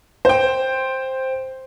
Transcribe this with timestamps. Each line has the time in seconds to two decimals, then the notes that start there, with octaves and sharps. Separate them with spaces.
0.25 C5 G5